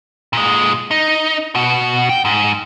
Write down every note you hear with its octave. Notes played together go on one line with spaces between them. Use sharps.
A#2 G#3
D#4
B2 F#4
G5
G#2